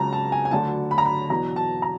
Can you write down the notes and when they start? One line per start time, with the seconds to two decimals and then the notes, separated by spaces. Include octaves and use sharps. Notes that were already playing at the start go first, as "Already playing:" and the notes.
Already playing: C#2 C#3 F#3 A5 A#5
0.13 A5
0.32 G#5
0.45 G#5
0.51 D2 D3 F#3 A5
0.91 B5
0.98 A#5
1.05 B5
1.30 E2 B2 F#3 A#5
1.56 A5
1.82 A#5